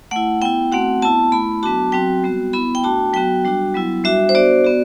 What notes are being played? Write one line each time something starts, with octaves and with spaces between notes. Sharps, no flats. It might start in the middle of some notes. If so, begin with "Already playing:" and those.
A3 E4 F#5
B3 E4 G5
A3 C4 F#4 F#5
B3 E4 A5
A3 E4 B5
F#3 B3 D4 F#4 A5
F#3 C4 F#4 G5
G3 B3 F#4
B3 E4 B5
G5
A3 D4 F#4 A5
F#3 B3 F#4 G5
G3 D4 F#4
F#3 B3 E4
G3 D4 F#4 E5
C5
B3 D4 F#4 D5
B3 F#4